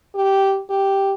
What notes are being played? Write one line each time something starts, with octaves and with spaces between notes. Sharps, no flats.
G4
G4